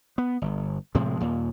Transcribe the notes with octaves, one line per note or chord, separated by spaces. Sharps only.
B3
G1
A2 C3 F3 G#3
D#2 A#2